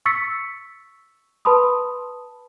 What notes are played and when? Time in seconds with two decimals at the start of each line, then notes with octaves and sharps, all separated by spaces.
0.06 C#6 E6 A6 B6 C#7
1.45 B4 A5 B5 C6 D#6